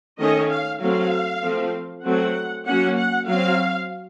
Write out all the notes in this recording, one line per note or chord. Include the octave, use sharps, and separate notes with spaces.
D#3 A3 C#4 D#5
F5
F#3 A3 C4 F5
F3 A3 C4
F#3 A3 C4 F#5
F#3 A#3 C#4 F#5
F#5
F#3 C4 F5